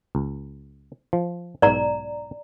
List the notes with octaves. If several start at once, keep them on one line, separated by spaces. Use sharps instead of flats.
C#2
F3
B1 G#2 D5 A#5